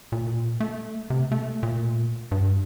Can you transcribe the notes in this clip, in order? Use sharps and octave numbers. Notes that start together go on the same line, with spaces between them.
A#2
A3
C3
A3
A#2
G2